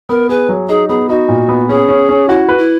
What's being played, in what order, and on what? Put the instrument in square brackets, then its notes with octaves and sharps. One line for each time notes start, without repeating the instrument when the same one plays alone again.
[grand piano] B3 [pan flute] A#4
[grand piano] G#4 [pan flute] B4
[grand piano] F#3
[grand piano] D#4 [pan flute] G#4
[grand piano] B3 [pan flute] G#4
[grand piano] D#4 [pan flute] F#4
[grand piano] A#2
B3
[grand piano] C#4 [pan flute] G#4
[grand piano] C#4
C#4
[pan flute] E4 [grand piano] F#4
[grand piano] B4
[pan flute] E4